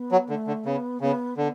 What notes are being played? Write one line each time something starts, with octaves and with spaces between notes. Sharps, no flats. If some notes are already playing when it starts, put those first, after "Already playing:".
Already playing: B3
F#3
D3 A3
D3
C#3 B3
C#3 B3
D3 B3